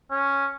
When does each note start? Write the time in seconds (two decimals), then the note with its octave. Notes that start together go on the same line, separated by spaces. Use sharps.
0.10 C#4